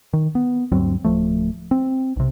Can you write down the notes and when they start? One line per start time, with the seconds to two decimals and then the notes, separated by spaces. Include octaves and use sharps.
0.13 D#3
0.35 B3
0.72 D2 G2 F#3 C4
1.04 D1 F3 A3
1.71 C4
2.16 B1 C3